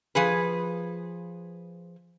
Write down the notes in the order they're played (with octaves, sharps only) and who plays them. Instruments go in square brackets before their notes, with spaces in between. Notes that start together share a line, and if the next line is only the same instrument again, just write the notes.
[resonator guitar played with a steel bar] F3 G#4 B4